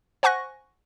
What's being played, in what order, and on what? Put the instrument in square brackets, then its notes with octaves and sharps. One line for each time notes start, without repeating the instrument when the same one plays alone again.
[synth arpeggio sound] C5 F#5 G#5 C#6 F#6 A#6